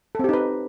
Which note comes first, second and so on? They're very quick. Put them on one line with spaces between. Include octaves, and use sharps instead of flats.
A4 C4 G4 D#4 B4